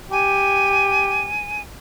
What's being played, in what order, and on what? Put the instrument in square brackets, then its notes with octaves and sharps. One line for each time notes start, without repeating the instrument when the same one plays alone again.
[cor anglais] G4 [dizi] G#5